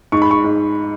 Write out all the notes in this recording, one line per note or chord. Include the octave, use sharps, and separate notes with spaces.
G#2 C#6
B5
C#6
G#2